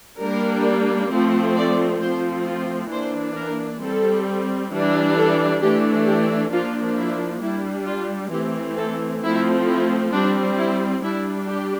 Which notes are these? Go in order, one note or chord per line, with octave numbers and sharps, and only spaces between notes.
G3 A#3 D4 A#4
F3 A3 C4
D5
F3 A3 C4 C5
F4
E3 A#3 D4 C5
A#4
G3 C4 A4
E3 G3 D4
A4
E3 A3 D4 G4
G4
F3 A#3 D4 F4
E4
G3 D4 E4
F4
E3 A3 C4 G4
A4
F3 A3 C4 E4
E4
G3 C4 D4
E4
G3 D4 E4
G4